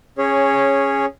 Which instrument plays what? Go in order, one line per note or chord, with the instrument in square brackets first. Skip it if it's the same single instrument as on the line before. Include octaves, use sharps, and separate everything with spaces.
[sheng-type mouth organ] C#4 G#4 C#5